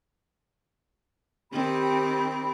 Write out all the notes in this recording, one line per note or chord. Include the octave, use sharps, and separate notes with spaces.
D#3 C4 G4 B5